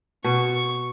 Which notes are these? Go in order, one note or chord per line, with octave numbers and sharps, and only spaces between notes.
B2 C#6